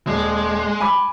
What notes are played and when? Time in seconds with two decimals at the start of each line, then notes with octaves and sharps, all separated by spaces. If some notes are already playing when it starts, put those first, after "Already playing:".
0.07 D#1 G#3
0.80 G#5 B5 D6